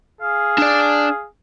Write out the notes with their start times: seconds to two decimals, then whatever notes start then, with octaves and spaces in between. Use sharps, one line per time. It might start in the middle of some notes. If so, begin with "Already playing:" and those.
0.21 G#4 F5
0.58 D4 D5